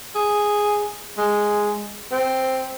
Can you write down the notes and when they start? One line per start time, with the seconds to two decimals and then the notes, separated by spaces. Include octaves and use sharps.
0.15 G#4
1.18 G#3
2.12 C4